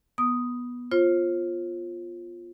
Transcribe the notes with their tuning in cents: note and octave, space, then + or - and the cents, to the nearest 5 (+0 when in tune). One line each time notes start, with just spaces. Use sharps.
B3 -15 D#6 +0
F4 +0 C5 +35